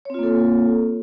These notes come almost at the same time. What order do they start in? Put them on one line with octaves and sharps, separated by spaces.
C#5 C4 F4 A#3 A4